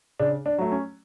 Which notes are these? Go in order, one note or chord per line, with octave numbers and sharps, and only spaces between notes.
C#3 D4
D4
F#3 A3
C#4